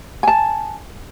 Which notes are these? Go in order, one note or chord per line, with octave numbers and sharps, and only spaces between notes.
G#5 A5